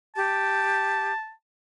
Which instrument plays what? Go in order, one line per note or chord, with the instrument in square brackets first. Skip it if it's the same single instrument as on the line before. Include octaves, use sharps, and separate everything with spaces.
[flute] G4 [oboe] A5